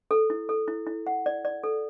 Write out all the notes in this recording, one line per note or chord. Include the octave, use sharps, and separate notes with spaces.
A4
E4
A4
E4
E4
F#5
D5
D5
A4